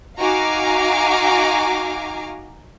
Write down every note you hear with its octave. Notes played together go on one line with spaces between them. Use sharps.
D#4 F#4 F5 G#5 A#5 D6